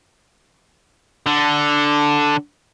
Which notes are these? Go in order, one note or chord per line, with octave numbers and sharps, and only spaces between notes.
D3